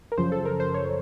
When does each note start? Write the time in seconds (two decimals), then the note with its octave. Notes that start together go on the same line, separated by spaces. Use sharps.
0.12 A#4
0.18 F#2 C#3 F3 C5
0.32 A4
0.45 A#4
0.60 C5
0.74 C#5